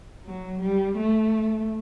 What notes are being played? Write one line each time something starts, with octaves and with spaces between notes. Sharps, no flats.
F#3
G3
A3